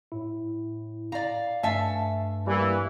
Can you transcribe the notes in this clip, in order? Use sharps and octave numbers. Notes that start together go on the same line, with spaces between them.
A2 E4
D5 F5 A#5
G2 A3 E5 F5 G#5 A5
E3 G3 A#3